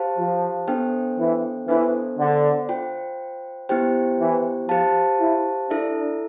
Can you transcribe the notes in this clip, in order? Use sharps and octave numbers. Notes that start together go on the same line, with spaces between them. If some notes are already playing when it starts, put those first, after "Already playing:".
Already playing: G4 C5 F5 A5
F3
B3 D4 A4 C5 G5
E3
E3 B3 D4 A4 C5
D3
F4 C5 G5
B3 E4 G4 C5 G5
E3
F3 G4 C5 F5 A5
E4
D4 E4 A4 E5